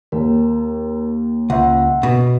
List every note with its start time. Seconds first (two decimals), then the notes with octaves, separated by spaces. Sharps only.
0.12 D#2 A#4
1.50 C#2 E5 F#5
2.03 B2